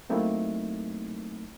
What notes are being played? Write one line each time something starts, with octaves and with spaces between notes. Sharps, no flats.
F#3 A3 A#3 C4 D#4 E4